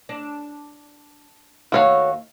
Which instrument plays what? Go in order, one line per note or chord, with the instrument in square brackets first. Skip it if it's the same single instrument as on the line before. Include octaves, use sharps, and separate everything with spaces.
[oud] D4
[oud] D#2 E5 F5 [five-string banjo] F#4 C#5